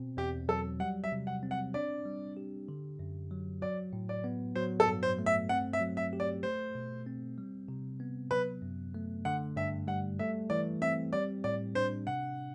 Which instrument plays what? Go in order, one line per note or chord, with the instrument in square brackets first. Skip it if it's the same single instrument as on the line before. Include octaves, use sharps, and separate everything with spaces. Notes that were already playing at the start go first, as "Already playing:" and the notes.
Already playing: [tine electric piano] B2 C4
[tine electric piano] E2 [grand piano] G4
[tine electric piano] F#3 [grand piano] A4
[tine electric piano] G3 [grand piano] F#5
[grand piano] E5
[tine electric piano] C3
[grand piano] F#5
[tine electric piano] C4
[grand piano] F#5
[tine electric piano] D4 [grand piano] D5
[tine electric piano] G3
G4
D3
F#2
F#3
[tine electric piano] F#3 [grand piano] D5
[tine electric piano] A2
[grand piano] D5
[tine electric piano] B3
[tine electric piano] F#3 [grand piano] C5
[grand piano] A4
[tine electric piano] G2
[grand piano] C5
[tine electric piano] A3
[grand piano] E5
[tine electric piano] C4 [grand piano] F#5
[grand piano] E5
[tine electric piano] F#3
[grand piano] E5
[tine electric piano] G4
[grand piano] D5
[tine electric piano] A3 [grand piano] C5
[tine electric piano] B2
C4
G3
C3
B3
[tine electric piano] F#3 [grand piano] B4
[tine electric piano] F#2
A3
[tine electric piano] D3 [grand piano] F#5
[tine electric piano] G2 [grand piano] E5
[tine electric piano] G3 [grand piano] F#5
[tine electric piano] A3 [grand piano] E5
[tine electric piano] E3 [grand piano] D5
[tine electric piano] C4 [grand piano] E5
[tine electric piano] G3 [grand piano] D5
[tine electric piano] A2 [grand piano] D5
[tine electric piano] D4 [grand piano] C5
[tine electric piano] C3 [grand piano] F#5